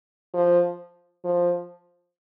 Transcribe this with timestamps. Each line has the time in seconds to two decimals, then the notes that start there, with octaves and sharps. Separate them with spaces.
0.34 F3
1.24 F3